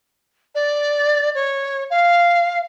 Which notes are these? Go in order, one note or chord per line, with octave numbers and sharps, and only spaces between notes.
D5
C#5
F5